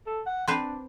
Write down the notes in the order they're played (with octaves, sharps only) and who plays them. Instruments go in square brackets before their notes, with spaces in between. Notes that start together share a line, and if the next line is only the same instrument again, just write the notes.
[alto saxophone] A4
F#5
[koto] C4 B4 C5 [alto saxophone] D4